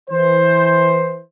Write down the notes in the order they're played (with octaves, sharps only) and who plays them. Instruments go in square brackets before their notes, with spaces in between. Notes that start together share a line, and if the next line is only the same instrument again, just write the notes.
[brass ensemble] E3 C5